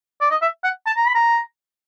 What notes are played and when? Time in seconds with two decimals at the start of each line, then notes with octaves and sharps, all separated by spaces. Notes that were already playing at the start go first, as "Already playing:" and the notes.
0.21 D5
0.31 D#5
0.42 E5
0.64 F#5
0.86 A5
0.97 A#5
1.07 B5
1.15 A#5